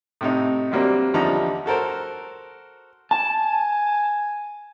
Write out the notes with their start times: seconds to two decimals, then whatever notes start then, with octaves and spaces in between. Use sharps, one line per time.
0.21 A2 C3 D#4
0.71 C3 F#3 G3 A#3 C4 D4
1.14 E2 D3 F3 G3 D#4 A#5
1.66 F#4 A4 A#4 C5
3.11 G#5 A5